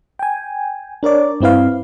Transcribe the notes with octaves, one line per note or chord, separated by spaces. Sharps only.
G5 G#5
D4 A#4 C#5 D5
G2 C4 E4 B4 F5